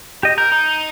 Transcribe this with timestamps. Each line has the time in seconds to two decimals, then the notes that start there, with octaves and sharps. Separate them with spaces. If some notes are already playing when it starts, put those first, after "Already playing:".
0.23 G4 D#5
0.38 A#4 G6
0.52 D#4